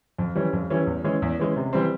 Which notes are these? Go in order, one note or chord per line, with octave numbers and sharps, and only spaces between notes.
F2
E3 G3 C#4
F2
E3 G3 C#4
E2
E3 G#3 C#4
E2
E3 G#3 C#4
C3
E3 G3 C4